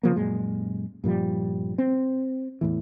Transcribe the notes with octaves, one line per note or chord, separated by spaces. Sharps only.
C#3 F3 A#3
F#2 A#2 G#3
G2 A#2 F3 G3
C4
E2 A2 E3